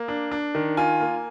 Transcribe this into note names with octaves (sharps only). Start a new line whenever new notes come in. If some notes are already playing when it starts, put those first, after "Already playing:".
Already playing: A#3
D4
D4
D#3
F4 G#5
A#3